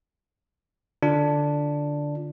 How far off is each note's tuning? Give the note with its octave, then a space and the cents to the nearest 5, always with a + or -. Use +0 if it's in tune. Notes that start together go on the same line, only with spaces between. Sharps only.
D3 +0 D4 +0 F4 +0